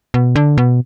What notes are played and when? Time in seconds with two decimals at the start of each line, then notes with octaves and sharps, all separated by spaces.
0.14 B2
0.36 D3
0.58 B2